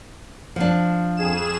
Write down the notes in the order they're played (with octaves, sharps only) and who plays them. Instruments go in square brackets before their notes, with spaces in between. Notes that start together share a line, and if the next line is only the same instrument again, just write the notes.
[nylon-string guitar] F3 D4
[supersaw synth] F2 G#4 E7